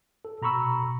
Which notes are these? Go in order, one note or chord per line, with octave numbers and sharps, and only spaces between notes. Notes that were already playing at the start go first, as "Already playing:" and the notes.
A4
B2 A#5 B5 C#6 E6